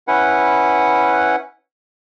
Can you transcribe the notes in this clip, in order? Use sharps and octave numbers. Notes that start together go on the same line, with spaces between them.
C#4 E4 B4 F#5